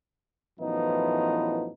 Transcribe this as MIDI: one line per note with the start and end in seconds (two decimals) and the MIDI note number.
0.59 1.70 42
0.59 1.70 45
0.59 1.70 52
0.59 1.70 53
0.59 1.70 59
0.59 1.70 63